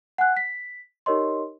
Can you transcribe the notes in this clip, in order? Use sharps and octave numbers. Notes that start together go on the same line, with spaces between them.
F#5 G#5 F#6
B6
D#4 G4 A#4 C#5 D#5 C6